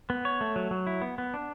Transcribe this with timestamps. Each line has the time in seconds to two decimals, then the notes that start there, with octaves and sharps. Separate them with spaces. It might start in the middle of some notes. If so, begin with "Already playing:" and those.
0.10 B3
0.25 C#5
0.41 A3
0.56 F#3
0.71 F#3
0.87 E4
1.02 B3
1.18 B3
1.34 D4